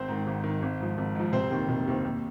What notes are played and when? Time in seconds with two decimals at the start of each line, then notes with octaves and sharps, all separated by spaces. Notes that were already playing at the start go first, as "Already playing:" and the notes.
Already playing: G#1 C4 C5
0.08 G#2 D#3
0.27 G#1
0.44 G#2 D#3
0.62 G#1
0.80 G#2 F3
0.98 G#1
1.15 G#2 F3
1.33 F1 C4 C5
1.51 D#2 D#3 C4
1.69 F1
1.87 D#2 D#3 C4
2.04 D#2